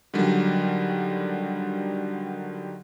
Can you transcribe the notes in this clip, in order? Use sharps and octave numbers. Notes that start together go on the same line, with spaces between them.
D3 D#3 F#3 G3